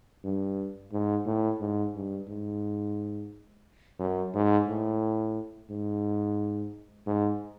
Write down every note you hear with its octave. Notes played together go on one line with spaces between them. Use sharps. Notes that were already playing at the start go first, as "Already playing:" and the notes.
G2
G#2
A2
G#2
G2
G#2
F#2
G#2
A2
G#2
G#2